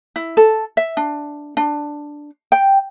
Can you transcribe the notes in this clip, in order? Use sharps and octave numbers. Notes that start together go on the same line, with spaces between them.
E4
A4
E5
D4
D4
G5